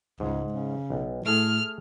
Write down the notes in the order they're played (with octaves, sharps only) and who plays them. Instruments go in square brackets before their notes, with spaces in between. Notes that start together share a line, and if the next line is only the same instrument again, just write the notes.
[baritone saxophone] C#2 [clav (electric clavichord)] G#2
[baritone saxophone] C#3
[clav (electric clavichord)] B1
[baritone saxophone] A2 [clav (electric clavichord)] A3 G#4 [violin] F6